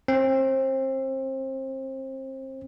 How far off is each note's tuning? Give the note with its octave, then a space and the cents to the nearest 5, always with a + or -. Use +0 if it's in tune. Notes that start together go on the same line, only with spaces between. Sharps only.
C4 +30